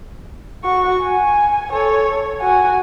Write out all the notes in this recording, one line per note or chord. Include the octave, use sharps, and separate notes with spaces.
F#4 C#6
G#5
A4 C#5
F#4 G#5